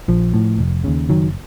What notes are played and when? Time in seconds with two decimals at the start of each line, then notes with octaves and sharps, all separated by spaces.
0.08 A#1 F3
0.34 A2
0.59 F1
0.84 D#2 C#3
1.09 F#1 D#3 F#3